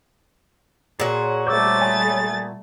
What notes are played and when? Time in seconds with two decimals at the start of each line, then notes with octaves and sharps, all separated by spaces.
1.00 A#2 F#4 G#4 C#5
1.47 G3 A3 C5 D6 E6 A6
1.81 G#5 B5 D#6